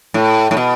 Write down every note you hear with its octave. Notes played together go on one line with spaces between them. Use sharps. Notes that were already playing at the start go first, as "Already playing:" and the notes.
A2
A2
B2